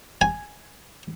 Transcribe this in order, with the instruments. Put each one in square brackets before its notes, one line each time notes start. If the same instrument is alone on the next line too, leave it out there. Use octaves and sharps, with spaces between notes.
[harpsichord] G#5